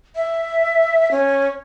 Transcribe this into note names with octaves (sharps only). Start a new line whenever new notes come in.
E5
C#4